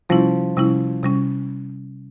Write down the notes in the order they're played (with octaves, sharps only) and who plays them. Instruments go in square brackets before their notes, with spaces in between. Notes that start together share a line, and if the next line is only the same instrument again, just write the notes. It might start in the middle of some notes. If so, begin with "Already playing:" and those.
[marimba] C3 G3 C#4 E4 [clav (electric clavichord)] F3
[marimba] C3 G3 C#4 E4
C3 G3 C#4